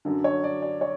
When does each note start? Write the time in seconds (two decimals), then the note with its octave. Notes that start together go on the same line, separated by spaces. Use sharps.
0.05 F#2 D3
0.24 C#5
0.44 D5
0.62 D5
0.81 C#5